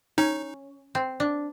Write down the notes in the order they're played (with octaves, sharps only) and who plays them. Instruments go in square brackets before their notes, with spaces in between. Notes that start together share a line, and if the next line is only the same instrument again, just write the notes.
[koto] C#4 [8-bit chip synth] D#4
[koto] C4
D4